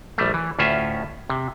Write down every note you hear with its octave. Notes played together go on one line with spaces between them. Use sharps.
A#1 G3 A3
E3
D2 A2 C#4 F4 E5
C3